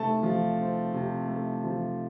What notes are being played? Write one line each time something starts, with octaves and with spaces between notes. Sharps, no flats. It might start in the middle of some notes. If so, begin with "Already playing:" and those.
Already playing: C3 A3 C4 A5
F3
C4
C3
A3
F3